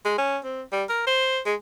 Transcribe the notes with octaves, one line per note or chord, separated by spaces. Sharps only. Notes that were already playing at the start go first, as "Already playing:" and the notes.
G#3
C#4
C4
G3
A#4
C5
G#3